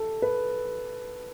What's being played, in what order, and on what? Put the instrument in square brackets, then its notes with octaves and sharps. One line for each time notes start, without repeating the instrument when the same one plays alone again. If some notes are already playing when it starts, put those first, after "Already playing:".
Already playing: [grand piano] A4
B4